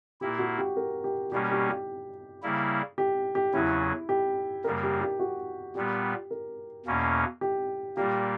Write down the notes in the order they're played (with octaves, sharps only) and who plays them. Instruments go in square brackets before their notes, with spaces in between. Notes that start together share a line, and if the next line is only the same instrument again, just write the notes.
[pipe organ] A#2 A#3 E4 [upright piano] G4
[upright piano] F#4
G4
A#4
G4
[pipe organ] B2 G3 A#3 C#4 [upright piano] G4
[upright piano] G4
G4
[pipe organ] C#3 G3 A#3 E4
[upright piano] G4
G4
[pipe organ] E2 C#3 F#3 C#4 [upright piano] E4
[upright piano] G4
[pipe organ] F#2 C#3 G3 A#3 [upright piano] A#4
[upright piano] G4
G4
F#4
[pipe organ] A#2 G3 B3 [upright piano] G4
[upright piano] A#4
[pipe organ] E2 B2 A#3 C#4
[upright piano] G4
[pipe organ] A#2 G3 A#3 [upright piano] G4